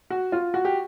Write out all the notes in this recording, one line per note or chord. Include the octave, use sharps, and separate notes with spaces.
F#4
F4
F#4
G4